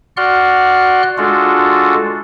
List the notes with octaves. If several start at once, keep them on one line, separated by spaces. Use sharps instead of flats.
F#4 D5 F#5 C6 F6 F#6
G#3 D4 F4 F#4 A4